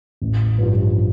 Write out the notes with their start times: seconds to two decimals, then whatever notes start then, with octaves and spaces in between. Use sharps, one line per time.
0.22 A1
0.58 G2 F3